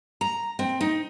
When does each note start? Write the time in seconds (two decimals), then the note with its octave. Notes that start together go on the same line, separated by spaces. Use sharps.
0.21 A#5
0.59 C4
0.81 D#4